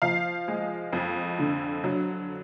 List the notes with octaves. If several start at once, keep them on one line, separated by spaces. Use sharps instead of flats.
F3 F5
G#3
F2
D3
F#3